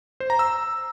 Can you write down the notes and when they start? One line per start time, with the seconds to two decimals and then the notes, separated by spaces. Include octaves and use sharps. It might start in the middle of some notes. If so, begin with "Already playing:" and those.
0.20 C5
0.30 A#5
0.39 E6